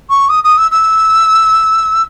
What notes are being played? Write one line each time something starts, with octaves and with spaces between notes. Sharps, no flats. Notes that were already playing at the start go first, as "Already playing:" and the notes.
C#6
D#6
D#6
E6
E6